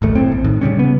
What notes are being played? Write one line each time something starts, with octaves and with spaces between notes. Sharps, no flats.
D1 A1 A3
F#1 A2 C4
A#1
A2 D#3
C#3 F3 G3 C#4
C#3 B3